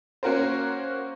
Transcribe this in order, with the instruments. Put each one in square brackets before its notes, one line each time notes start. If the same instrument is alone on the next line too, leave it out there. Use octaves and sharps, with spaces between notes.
[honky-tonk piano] A#3 C#4 F#4 A#4 C5